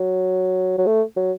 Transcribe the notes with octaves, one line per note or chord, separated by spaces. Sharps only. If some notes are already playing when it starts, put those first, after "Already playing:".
Already playing: F#3
F#3
A3
F#3